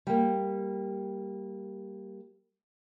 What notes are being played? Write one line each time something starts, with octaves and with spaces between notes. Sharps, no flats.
G3 A#3